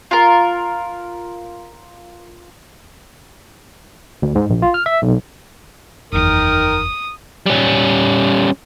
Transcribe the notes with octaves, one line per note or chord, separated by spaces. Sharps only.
F4 A#4
D2
G#2
A#1
F4
F6
E5
B1
F#1 E2 D#3 A#4 D#6
G3 C#4